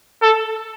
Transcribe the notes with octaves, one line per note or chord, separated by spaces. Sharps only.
A4